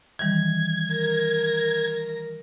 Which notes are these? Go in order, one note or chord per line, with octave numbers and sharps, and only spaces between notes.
D#3 E3 G3 G#6
A#4 A#6